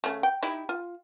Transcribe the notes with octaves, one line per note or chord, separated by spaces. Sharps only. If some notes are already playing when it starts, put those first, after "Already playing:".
C#3 A3
G5
D#4 E4 G4
F4